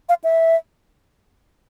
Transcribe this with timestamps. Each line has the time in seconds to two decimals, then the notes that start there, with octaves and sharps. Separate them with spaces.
0.09 F5
0.24 E5